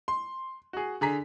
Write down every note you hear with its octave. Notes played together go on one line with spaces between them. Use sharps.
C6
F#4 G#4
D3 G#4 A#5 B6